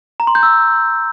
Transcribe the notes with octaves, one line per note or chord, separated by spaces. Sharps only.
A#5
C6
G6
E6